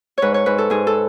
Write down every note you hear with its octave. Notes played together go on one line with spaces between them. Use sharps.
G#2 B4 C#5
C#5
G#2 B4
A4
G#2 G#4
A4